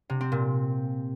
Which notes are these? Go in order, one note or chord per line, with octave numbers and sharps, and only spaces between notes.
C3
C4
A#2